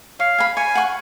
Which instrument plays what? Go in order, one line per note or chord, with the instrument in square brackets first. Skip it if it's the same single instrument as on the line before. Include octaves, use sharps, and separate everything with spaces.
[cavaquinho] C#5 [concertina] F5
[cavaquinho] G#5 B5
[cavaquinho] C#5 [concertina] G#5
[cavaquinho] F#5 C#6